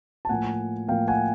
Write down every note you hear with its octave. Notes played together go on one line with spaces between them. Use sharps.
A5
A2 F3 A#3 F#5 G#5
A2 F3 A#3 F5 G5
F#5 G#5